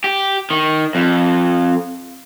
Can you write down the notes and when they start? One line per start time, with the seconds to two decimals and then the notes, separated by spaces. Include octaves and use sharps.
0.04 G4
0.50 D#3
0.95 F2